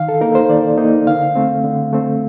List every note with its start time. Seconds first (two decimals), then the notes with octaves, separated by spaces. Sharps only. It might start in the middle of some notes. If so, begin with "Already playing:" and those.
Already playing: D#3 F5
0.09 A4
0.21 A#3 D#4 A#4
0.35 C5
0.50 D#3 D5
0.78 A#3 D#4
1.07 D3 F5
1.35 A3 C4
1.64 D3
1.93 A3 C4